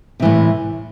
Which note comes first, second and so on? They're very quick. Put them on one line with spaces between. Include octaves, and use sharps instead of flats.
C3 E3 A2